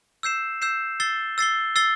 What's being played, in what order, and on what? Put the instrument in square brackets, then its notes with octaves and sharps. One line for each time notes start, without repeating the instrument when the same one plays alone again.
[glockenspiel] E6 G6 C7 E7
E6 G6 C7 E7
E6 A6 C7 G7
E6 A6 C7 G7
E6 A6 C7 G7